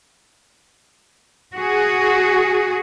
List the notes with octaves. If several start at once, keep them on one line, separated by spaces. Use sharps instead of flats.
F#4 G#4